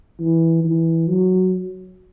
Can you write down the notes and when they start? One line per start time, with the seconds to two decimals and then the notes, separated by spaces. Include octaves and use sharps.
0.20 E3
0.64 E3
1.08 F#3